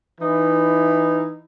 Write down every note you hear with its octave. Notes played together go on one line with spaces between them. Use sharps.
E3 D#4 E4